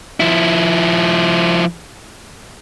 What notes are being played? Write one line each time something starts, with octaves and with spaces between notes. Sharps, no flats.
F3 E4